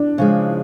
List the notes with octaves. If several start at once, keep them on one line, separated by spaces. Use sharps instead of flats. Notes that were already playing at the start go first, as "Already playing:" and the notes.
Already playing: D4
C#3 F3 G#3